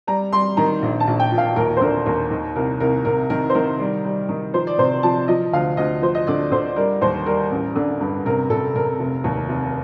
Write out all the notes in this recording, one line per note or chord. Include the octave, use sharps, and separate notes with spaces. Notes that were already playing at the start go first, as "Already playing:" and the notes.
G3 A#5
G3 C6
D#3 A#5
A#1
A5
A#1
G5
A#2
F5
D#2 A#4
C5
D3 A#4
D#2 A#4
D#3 A#4
C2 A#4
C2 A#4
C3 A#4
D#3 A#4
C5
D#3 A#4
G3
G3
D#3
F3 C5
D5
C3 C5
F3 A5
F3 D#5
D2 F5
D2 D#5
F3 C5
D#5
D3 D5
D3 C5
G3 A#4
D#2 C5
G3 A#4
A1
D3
G2
C3 A#4
C3 A4
C3 A#4
F1
D#2
F1